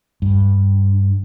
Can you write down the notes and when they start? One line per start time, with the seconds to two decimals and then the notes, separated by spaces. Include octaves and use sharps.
0.22 G2